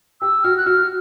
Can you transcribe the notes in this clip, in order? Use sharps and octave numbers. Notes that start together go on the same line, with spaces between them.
G4 E6
F#4 F6
F#6
F#4 F6